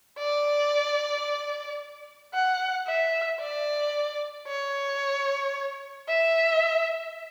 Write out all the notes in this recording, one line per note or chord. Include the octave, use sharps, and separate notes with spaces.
D5
F#5
E5
D5
C#5
E5